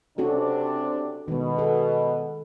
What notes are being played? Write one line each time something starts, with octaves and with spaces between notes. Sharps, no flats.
C3 C#4 D4 F#4 A4
B2 D#3 G#3
G#4 A4